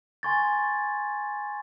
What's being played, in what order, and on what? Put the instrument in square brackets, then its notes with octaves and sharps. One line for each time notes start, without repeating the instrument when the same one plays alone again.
[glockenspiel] G#5 C6 C#6 G#6 A6